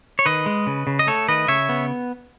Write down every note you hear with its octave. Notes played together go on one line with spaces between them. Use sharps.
C#5
D#3 B4 D#5
G#3
C#3
C#3
D#5
A3 A4 C#5
D#3 B4 D#5
C#3 C#5 E5
B3